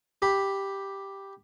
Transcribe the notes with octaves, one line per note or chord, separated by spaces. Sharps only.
G4 B5